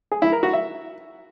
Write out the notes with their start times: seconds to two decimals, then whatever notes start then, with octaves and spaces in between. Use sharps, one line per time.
0.12 G#4
0.22 E4
0.32 A#4
0.43 F#4
0.53 E5